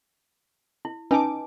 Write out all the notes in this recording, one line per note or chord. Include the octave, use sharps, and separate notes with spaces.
E4
C#4 D#4 B4 G#5 A5 D6